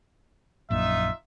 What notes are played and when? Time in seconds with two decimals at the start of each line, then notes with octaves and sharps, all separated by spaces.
0.71 A#1 F#2 A#2 D#4 F4 E5